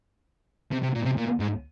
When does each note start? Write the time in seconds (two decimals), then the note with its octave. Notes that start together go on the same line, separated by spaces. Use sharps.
0.72 C3
0.82 C3
0.95 A#2
1.05 C3
1.17 A#2
1.40 G#2